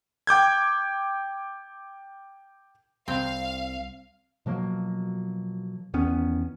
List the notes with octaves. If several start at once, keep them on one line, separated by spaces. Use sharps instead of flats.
G5 D6 G6 G#6
C2 C4 F5
B2 F3 F#3 A#3
E2 D#3 B3 C#4